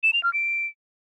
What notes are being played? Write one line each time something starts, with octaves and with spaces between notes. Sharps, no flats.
E7
F7
F6
D7